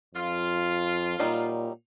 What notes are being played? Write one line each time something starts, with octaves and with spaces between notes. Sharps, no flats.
F2 F4
A#2 F#3 G3 D#4